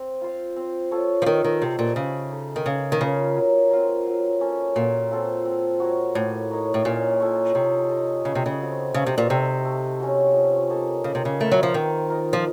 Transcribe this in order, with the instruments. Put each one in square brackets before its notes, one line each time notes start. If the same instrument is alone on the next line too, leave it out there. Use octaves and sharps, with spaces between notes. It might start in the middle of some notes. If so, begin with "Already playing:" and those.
Already playing: [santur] C4
F4 C5 F5
C4
F4 A4 C#5
[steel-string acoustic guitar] F3
[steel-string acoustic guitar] D#3 [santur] D#4
[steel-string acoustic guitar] D#3
[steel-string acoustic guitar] C3 [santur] F#4 C5
[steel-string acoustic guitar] A#2
[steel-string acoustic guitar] C#3 [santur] A3
[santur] D#4 A4
[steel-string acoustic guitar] D#3
[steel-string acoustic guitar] C#3 [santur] A#3
[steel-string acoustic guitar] D#3
[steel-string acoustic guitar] C#3 [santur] F4 A#4 C#5
[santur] F#3
C4 F4 A#4
F#3
A#3 C#4 A4
[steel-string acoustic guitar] A#2 [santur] F#3
[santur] C4 F4 A4
C4
F#4 A#4 C#5
[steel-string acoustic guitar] A2 [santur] A#3
[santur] D#4 A#4 C#5
[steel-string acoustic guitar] A2
[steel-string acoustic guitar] A#2 [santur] C#4
[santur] F4 A4 C#5
[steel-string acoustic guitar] C3 [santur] D#4
[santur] A4 D#5
[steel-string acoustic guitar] C#3 [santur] A3
[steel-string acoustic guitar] C3
C#3
[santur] C4 F#4
[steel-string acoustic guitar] C#3 [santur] A3
[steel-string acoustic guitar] C3
A#2
[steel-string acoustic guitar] C3 [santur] D#4 A4
[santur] A3
C#4 F#4
F3
A#3 D#4 A4
[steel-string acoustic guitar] C#3 [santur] A#3
[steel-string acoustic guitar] C3
C#3
[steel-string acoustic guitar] A3 [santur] F4 A#4
[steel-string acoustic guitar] F#3
F3
[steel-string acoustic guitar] D#3 [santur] C4
[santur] F4 A#4 D#5
[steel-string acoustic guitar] F3